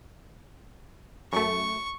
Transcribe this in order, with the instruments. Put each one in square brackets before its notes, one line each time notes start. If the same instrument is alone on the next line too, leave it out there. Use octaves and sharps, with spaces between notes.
[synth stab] F#2 A3 [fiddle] C#6